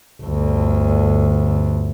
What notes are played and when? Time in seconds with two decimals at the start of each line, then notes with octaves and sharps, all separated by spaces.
0.22 G1 D2